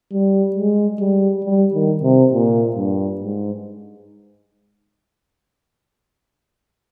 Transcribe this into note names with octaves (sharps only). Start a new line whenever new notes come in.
G3
G#3
G3
G3
D#3
C3
A#2
G2
G#2